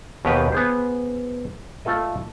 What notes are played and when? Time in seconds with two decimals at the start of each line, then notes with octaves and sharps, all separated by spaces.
0.25 D#2 B2 D#3 G4 B4
0.52 B3 G#4 C5
1.85 A3 F4 A4 D#5